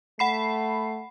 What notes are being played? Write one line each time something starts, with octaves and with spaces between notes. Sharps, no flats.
A3 F#5 B5 C7